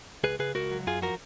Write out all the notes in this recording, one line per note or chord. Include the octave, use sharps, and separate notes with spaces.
C#2 G#4 B4
C#3 G#4 B4
C#2 F#4 A#4
F#3
F#2 F4 G#4
F3 F#4 A#4